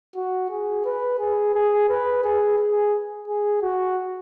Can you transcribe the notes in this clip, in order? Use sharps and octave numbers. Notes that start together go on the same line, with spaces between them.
F#4
G#4
B4
G#4
G#4
B4
G#4
G#4
G#4
F#4